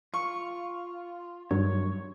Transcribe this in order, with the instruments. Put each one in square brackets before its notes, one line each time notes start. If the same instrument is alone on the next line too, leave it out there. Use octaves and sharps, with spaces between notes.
[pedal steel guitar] F4 [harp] C#6
[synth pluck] G2 D#3 F#3 [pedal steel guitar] C#5